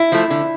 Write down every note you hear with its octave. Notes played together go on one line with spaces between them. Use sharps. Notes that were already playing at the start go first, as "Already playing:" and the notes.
Already playing: E4
F3 A3
D3